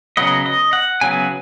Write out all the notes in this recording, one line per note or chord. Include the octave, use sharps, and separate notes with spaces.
C#3 F#3 B3 D#5
D#5
F#5
C#3 F#3 B3 G#5